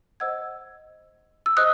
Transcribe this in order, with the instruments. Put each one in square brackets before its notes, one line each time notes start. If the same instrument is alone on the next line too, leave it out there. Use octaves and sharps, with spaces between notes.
[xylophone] C5 D#5 F#5 E6 G#6
E6
C5 D#5 D#6 F#6